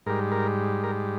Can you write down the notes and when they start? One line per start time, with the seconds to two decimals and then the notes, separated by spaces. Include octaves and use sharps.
0.06 G#2 G3 A#4
0.32 A#4
0.84 A#4